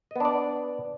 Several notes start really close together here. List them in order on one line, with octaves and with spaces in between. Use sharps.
D#5 B3 D4 D5